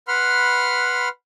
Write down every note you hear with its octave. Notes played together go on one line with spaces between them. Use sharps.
B4 F#5 B5 C6 F6